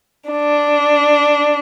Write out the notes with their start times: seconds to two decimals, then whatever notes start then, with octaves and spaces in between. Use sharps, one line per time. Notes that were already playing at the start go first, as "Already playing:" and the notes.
0.30 D4